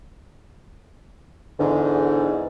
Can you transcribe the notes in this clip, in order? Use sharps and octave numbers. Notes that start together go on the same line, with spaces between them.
E2 G#2 D3